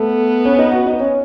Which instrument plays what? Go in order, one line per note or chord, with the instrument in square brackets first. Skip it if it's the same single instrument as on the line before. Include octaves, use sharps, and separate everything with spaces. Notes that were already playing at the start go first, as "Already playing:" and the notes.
Already playing: [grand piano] A3 A4 [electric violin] B3
[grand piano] C#4 C#5
D#4 D#5
F#4 F#5
D#4 D#5
C#4 C#5